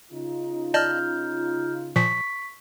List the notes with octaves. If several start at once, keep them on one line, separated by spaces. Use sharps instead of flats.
C#3 D#4 F4
D5 D#5 A5 F6 G6
A#2 F3 C#6 B6